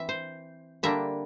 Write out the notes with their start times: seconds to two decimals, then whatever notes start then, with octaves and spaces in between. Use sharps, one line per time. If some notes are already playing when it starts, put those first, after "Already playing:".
Already playing: E3 C4 E5
0.09 C5
0.83 D3 G3 A#3 D4 E5